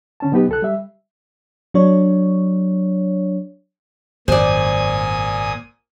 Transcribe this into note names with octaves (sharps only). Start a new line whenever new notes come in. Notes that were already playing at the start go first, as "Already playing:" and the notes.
D3 C#4 A5
B2 F#3 B3 D#4 G4 B4
C2 A4 F#6
G3 E5
F#3 D4 C#5
G#1 F#2 A#2 C5 D5 G#5 D#6